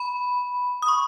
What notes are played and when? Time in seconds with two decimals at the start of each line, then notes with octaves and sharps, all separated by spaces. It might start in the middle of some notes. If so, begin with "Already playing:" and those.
Already playing: B5
0.82 D#6
0.88 C#6